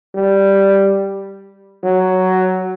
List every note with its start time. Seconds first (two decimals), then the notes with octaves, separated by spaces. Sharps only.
0.15 G3
1.83 F#3